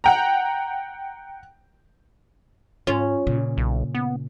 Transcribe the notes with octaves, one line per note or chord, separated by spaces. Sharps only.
F#5 G5 A#5
G#2 C#4 F4
A#2 C#3
B1
B3